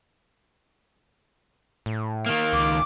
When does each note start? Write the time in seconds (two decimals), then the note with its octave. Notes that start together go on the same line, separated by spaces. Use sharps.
1.86 A2
2.26 D#3 A#3
2.53 C#2 D6